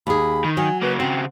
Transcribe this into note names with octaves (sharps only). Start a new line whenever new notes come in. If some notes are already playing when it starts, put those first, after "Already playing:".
D#2 G#4 B5
D#3
F#3 G#5
C#3 A#3 B4
C#3 C4 F#4 G5